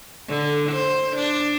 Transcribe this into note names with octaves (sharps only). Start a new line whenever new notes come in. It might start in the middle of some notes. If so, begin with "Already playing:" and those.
D3
C5
D4